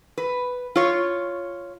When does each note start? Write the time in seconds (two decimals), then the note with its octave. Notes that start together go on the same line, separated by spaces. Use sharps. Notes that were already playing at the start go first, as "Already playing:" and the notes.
0.18 B4
0.76 F4 C#5